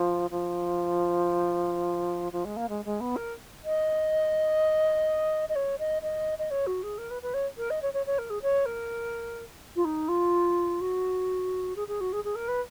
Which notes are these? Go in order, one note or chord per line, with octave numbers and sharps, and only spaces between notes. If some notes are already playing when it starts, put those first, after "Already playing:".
Already playing: F3
F3
F3
G#3
A#3
G#3
G#3
B3
A#4
D#5
D#5
C#5
D#5
D#5
D#5
C#5
F#4
G#4
A#4
B4
B4
C#5
A#4
D#5
C#5
C#5
C#5
A#4
G#4
C#5
A#4
F4
D#4
F4
F#4
G#4
G#4
F#4
G#4
G#4
A#4
B4